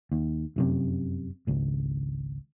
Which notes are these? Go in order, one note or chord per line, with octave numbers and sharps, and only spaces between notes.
D#2
F1 F#2 C3
G#1 C#2